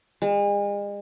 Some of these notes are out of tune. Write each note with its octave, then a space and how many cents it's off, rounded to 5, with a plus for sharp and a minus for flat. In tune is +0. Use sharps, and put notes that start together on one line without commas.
G#3 -40